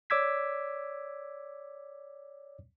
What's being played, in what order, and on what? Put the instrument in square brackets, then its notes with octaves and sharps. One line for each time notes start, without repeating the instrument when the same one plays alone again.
[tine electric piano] C#5 D5 D6 E6 G#6 B6